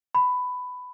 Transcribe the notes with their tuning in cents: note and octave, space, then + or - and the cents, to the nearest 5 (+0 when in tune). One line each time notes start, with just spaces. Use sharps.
B5 +15